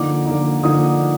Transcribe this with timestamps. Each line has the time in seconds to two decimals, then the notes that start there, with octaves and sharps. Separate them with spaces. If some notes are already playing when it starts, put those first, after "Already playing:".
Already playing: D3 F3 A#3 D#4 D6
0.26 D3 F3 A#3 D#4
0.63 D3 F3 A#3 D#4 D#6